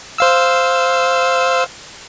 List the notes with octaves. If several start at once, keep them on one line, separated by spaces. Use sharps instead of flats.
C5 F5 E6